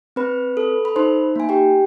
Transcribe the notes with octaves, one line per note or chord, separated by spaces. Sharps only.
C4 B4 B5
A4
B5
D#4 C5 C6
A#3 G#5
G4 G5